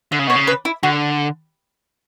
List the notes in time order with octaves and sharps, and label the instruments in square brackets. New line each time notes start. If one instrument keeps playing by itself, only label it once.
[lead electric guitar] D3 [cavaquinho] E5
[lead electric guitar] C#3
[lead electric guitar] B2 [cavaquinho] C#5
[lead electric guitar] C#3
[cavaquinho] B4
E4
[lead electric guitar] D3 [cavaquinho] F#4